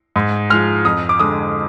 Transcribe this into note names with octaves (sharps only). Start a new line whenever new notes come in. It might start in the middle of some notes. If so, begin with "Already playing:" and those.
G#2
F3 G#3 F6
F2 D#6
D6
D3 G#3 D#6